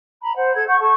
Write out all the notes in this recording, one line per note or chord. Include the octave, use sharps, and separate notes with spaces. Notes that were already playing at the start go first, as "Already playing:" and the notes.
A#5 B5
C5 F#5
A4 G#6
F#5 C#6 G6
A4 A5 C#6